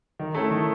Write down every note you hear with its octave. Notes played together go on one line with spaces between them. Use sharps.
D#3
A3 C#4 E4 A4
D#3